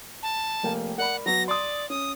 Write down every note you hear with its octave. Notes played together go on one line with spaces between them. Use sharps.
A5
F1 A#3 G5
A#4 D5 F#5 B5
F#3 B3 A#6
D5 C6 D#6
C#4 D#6